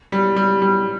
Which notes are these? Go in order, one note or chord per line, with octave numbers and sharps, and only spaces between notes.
G3
G3
G3